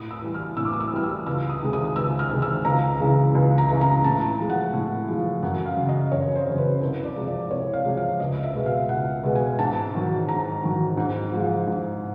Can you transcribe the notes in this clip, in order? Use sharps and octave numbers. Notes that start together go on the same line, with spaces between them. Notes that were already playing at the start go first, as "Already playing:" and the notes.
Already playing: A2 D#6
E6
E3 G3
F6
A2 E6
D6
D#6
E6
E3 G3 F6
E6
C#2 E6
D#6
C3 D#3 G#3
D#6
C#2 E6
F6
C3 D#3 G#3
E6
C#2 A#5
C#3 E3 G#3
C#2
A#5
C#3 E3 G#3
A#5
A2 A5
F3 G#3
F#5
A2
F3 G#3
F#2 F#5
F5
C#3 F#3
D#5
F#2 C#5
C5
C#3 F#3
B4
C2 C5
D5
C3 F3 G#3
D5
C2 C#5
F5
C3 F3 G#3
F5
C#2 D#5
E5
B2 G#3
F5
C#2 F#5
B2 G#3
G#5
G#2 A5
D#3 F#3
G#2 A#5
D#3 F#3
G#2
F3 G#3
G#2